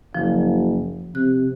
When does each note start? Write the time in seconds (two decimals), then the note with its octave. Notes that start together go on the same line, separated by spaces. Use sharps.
0.15 F#1 F3
1.15 C3 F#6